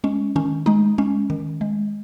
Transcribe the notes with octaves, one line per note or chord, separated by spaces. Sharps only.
G#3 C#4
D#3 C#4
G#3 D#4
G#3 C#4
D#3
G#3